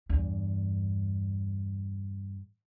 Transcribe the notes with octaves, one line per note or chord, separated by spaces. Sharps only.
E2 G2